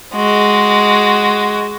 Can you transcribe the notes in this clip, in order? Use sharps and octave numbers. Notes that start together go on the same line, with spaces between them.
G#3 F#4